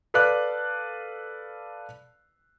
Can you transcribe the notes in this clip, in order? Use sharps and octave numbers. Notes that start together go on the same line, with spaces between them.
A4 B4 D5 F5 D6 F#6